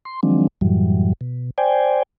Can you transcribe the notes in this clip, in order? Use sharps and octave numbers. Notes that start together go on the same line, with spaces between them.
C6
D#3 F3 F#3 G#3 C4 D4
F#2 A2 E3 F#3 G3
B2
C5 D5 G5 G#5